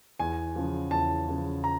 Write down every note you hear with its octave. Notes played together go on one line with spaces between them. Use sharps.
E2 G#5
C#3 F3
E2 A5
C#3 F3
A#5